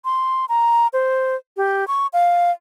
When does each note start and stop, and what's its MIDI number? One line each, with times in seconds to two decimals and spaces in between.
0.05 0.45 84
0.49 0.87 82
0.93 1.36 72
1.57 1.87 67
1.87 2.07 85
2.13 2.51 77